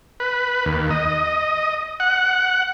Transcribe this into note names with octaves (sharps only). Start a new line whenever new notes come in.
B4
D#2
D#5
F#5